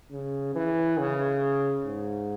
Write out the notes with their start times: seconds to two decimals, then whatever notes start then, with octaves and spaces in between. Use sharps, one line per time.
0.12 C#3
0.56 E3
0.98 C#3
1.86 G#2